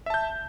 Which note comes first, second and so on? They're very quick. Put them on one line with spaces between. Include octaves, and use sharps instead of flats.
E5 A5 G6